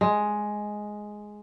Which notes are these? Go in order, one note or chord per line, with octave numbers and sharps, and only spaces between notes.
G#3